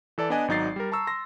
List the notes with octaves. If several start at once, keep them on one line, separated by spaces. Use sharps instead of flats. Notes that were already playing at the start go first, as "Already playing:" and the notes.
E3 A4 D5 A5
B3 D4 B4 D5 D#5 G#5
G#1 F#3 D#4 D5 A6 C7
G3 A#4
A5 A#5 C#6 E6
C6 A#6